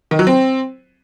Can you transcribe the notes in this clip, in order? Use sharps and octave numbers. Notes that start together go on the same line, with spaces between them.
D#3
F#3
C4